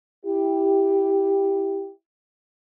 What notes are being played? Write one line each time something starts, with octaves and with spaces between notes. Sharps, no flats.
E4 G4